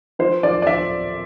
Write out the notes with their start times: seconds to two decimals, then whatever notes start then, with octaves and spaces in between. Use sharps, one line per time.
0.19 F3 C5
0.43 F3 D5
0.62 D5
0.67 F3 E5